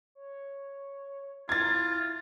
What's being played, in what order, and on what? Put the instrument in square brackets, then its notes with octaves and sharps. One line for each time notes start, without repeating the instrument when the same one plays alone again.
[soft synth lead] C#5
[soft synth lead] E4 [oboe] F4 [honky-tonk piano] G#6 A6